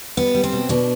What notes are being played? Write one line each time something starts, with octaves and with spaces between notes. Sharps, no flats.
G3 B3
G3
C4
B2
B2 D4